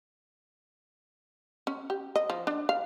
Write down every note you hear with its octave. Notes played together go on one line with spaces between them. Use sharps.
C#4
G4
D#5
F3
D4
F5